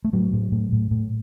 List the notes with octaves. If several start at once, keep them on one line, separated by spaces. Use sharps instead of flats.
A3
A2 F#3
A2
A2
A2
A2